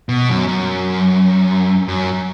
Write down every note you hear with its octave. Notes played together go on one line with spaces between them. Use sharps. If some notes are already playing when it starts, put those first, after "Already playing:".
B2
F#2
F#2
F#2